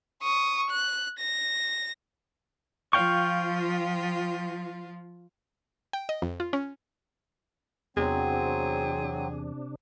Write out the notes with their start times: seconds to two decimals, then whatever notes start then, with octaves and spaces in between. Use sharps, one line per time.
0.22 C#6 D#6
0.70 F#6
1.19 A#6
2.93 F3 F4 F5 G5 C#6
5.93 G5
6.09 D#5
6.22 F2
6.40 F4
6.53 C#4
7.97 E2 C3 F#3 C4 D4 G#4